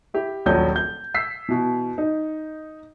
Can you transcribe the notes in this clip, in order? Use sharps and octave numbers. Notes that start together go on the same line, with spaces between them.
E4 G4
D#1 A#1 F#3 G6
G6
E6 B6 C7
B2 E3
D#4